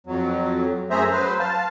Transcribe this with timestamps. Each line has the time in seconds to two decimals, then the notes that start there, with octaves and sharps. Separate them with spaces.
0.07 F2 F#3
0.90 F#2 A3 G#4 C5 E5 A#5
1.12 F#3 B4 C5
1.39 F5 A5